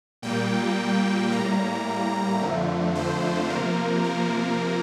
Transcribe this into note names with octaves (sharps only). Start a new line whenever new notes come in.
A#2 G3 A#3 G5
A2 G3 A#3 A#5
F2 D3 F3 A3
C5
C3 F3 A#3 A#4
A#4